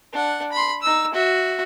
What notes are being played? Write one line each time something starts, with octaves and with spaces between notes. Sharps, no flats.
D4 F#5
B5 C6
D#4 E6
F#4 E5